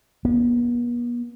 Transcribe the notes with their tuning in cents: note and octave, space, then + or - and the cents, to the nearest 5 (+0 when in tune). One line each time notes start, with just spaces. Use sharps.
B3 -45